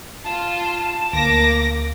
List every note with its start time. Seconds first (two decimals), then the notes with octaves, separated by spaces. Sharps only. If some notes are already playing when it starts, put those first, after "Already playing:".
0.24 F4 A5
1.13 D2 A#3 D6 A#6